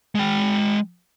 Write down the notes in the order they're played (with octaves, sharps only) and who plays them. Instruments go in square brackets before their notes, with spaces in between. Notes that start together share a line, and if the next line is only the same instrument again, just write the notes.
[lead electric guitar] G#3 G5